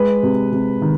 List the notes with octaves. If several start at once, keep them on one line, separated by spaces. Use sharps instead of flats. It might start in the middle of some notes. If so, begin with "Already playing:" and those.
Already playing: G#3 B4
C3
C3
D#3